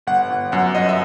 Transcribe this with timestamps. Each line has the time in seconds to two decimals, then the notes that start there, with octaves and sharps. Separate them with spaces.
0.07 G1 F#5
0.30 G1
0.52 F#2 F#5
0.75 G1 D#5
0.89 E5